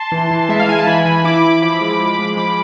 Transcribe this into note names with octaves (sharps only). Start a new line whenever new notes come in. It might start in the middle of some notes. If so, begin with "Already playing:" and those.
Already playing: A5 C6
E3
E3
G#3 E5
F5
E4 G#5
A5
E3 G#5 B5
E3
E4 B5 D6
E4
F3 B5 D6
G#3
F3
G#3
F3 B5 D6